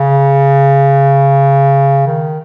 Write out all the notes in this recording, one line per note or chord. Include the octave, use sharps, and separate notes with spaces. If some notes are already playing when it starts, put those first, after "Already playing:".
Already playing: C#3
D#3